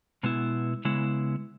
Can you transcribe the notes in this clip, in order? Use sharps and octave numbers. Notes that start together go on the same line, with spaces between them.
B2 G#3 B3 E4
C#3 G#3 B3 E4